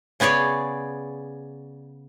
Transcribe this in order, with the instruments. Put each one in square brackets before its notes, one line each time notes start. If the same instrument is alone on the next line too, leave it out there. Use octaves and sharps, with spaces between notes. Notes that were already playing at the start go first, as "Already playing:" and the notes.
[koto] C#3 B3 G#4 C#5 D5